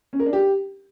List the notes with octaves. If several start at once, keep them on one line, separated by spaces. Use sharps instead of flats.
C#4
A#4
D4
G4